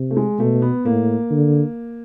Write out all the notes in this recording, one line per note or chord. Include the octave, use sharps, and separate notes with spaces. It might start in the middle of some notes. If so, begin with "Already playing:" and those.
Already playing: C3
A3
G#3
B2 A3
B3
A2 A#3
D3